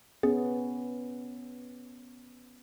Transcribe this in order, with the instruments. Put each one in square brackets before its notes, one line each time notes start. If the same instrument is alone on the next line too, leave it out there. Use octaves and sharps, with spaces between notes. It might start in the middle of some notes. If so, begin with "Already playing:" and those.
[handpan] B3 C#4 [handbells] G#4